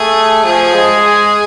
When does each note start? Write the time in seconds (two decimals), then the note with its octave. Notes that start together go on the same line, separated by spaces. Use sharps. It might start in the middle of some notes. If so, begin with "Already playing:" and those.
Already playing: A3 G#4
0.44 F3 G#4
0.74 G#3
1.04 G#4